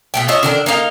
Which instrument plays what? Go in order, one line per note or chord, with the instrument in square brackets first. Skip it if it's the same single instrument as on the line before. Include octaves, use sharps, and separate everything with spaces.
[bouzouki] B2 A3 G5
F4 C#5 D#5 E5
D3 D#3 D4
A#3 D4 D#4 F5